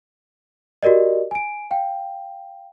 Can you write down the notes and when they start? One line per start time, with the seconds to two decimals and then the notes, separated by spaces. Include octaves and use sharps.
0.83 F#4 G4 A#4 D5 D#5
1.31 G#5 D7
1.71 F5 G5